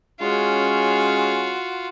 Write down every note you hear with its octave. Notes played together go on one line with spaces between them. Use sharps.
G#3 C#4 F4 F#4